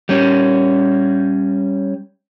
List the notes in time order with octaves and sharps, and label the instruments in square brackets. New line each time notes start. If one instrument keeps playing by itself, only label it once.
[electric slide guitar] G3 C#4